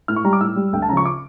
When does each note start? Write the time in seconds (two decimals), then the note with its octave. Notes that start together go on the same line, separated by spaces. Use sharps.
0.08 A2 F6
0.16 C#6
0.24 G3 A#5
0.33 D6
0.41 A2 E6
0.56 G3
0.73 D2 G5
0.82 A5
0.89 C#3 A#5
0.93 F3 C#6
1.06 D6